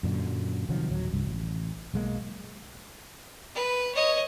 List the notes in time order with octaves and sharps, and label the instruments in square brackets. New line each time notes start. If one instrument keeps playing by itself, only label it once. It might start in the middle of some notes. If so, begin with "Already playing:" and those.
[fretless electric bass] F#2 A#2 D3
C3 D#3 F3 F#3
D1 F#3
C2 G2
A1
B1 G#3 A#3
[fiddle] B4
C#5 D#5